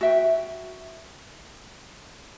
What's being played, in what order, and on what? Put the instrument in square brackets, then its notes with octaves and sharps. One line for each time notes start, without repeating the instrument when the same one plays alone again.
[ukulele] F#4 E5 G5